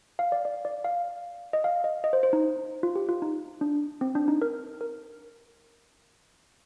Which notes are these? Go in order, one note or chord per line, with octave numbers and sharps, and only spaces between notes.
F5
D5
D5
D5
F5
D#5
F5
D#5
D#5
C5
C5
D#4
F4
G4
F4
D#4
D4
C4
D4
D#4
A#4
A#4